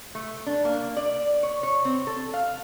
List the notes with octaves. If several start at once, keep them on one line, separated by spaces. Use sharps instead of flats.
A3
D4
A#3
D5
C#5
C#5
C4
A4
F5